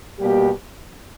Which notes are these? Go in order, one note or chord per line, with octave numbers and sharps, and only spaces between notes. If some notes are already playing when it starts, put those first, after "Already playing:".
B2 G3 A#3 G4